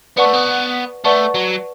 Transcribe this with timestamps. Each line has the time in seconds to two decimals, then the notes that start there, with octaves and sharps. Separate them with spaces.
0.17 B3 B4 D5 F#5 A5 C#6
0.25 A3
0.34 B3
1.05 A3 B4 D5 F#5 A5 C#6
1.35 F#3